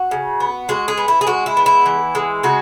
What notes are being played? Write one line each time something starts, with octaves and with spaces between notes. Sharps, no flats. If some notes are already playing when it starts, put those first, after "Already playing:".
Already playing: F#4
C#3
B3
G#3 F#4
G#4
B3
E4
G#4
G#3 F#4
E4
B3
E4
E3
G#3
C#3 F#4